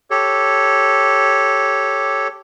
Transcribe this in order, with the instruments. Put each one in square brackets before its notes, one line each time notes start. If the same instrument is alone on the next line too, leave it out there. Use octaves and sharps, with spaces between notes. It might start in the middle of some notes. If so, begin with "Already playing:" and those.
[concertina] G4 A4 C#5